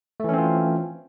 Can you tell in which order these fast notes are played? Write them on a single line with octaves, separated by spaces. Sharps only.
A3 E3 C#4 C4 F4